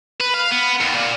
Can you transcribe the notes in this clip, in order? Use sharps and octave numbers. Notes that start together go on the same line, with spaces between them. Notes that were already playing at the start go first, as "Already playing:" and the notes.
B4
F5
B3
D#2
A#2